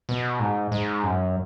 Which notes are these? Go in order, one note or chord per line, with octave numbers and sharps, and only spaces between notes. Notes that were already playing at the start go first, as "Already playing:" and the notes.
B2
G#2
G#2
F#2